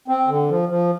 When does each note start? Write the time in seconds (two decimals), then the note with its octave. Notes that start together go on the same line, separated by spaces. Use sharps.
0.08 C4
0.27 D3
0.49 F3
0.69 F3